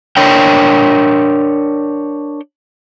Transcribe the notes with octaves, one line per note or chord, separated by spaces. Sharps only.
D4 A#4 C#5 G5